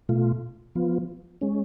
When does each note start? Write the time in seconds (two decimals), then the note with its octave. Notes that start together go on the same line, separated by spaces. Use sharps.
0.09 B2 A3 F4
0.75 F3 B3 F4
1.41 G#3 C#4